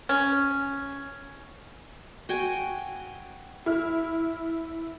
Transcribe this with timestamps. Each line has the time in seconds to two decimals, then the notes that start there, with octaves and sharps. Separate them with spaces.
0.09 C#4
2.29 F#4 G5 G#5
3.66 E4 F6